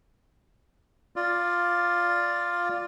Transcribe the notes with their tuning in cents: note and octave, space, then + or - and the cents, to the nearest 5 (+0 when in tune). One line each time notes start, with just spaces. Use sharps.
F4 +0 D5 +0